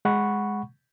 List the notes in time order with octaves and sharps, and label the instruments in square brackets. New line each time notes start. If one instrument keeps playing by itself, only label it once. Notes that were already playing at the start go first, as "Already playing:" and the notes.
[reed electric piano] G#3 F#5 B5 C#6